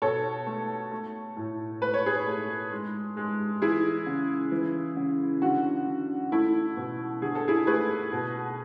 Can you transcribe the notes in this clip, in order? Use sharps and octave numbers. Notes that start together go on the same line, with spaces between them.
B2 A4 C#5
A3
A3
A2
A3 B4
C#5
G#4 B4
A3
G#3
G#3
E3 E4 G#4
C#3
E3
C#3
D3 F#4
D3
A3 E4
B2
D3 G#4
A4
E4 G#4
A3 G#4 B4
B2